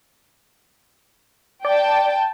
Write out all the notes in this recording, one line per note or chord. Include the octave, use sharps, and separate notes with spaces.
D5 G5 A5